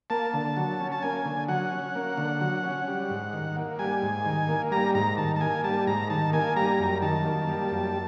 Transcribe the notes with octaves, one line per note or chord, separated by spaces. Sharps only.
A#3 A5
D3
F#3
C#4
A5
A#3 G#5
D3
F#3 F#5
C#4
A#3
D3
F#3
C#4
G3
G#2
D#3
A#3
G3 G#5
G#2
D#3
A#3
G3 A#5
G#2 A#5
D#3 A5
A5
A#3 G#5
G3 A5
G#2 A#5
D#3 A5
A#3 G#5
G3 A#5
F#2
D#3 A5
A#3
G3
F#2